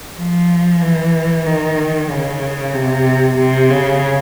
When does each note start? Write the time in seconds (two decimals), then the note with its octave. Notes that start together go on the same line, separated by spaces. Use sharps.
0.19 F3
0.82 E3
1.46 D#3
2.10 C#3
2.74 C3
3.39 C3
3.70 C#3